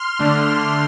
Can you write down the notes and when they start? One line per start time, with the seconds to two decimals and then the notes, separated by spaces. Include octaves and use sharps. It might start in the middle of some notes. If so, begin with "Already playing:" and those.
Already playing: C6 F6
0.19 D3 A3 D4